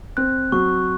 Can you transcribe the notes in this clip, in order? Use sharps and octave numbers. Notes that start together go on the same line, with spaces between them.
C4 F#6
F#3 C#6